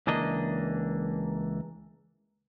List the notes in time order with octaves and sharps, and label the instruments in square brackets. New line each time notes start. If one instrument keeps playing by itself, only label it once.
[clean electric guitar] C#2 E3 A#3 D4 D#5